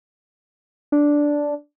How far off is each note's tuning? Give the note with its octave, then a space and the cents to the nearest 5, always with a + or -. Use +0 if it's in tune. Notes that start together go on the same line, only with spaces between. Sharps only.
D4 -5